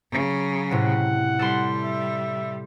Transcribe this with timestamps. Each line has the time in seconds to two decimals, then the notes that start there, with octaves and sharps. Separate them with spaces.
0.12 C#3 F#3
0.71 A2 C3 F#5
1.39 G3 A4 C6
1.81 E5